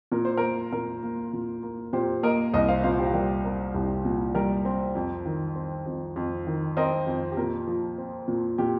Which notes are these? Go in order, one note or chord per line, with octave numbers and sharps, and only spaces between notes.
A#2 A#4
C5
A#3 A#4
A#2 A#4
A#3
A#2
A#3
A#2 G4 C5
A#3 A#4 D#5
C2 A#4 D#5
C5 F5
A#2 C5 F5
G4 C5
G3 A#4
C4 A#4
C2 G4
A#2
G3 A#4
C4
F2
D#3
C4
F2
F2
D#3
C4 A#4 D#5
F2
G4
A#2 A#4
F3
C4
A#2
A#2 G4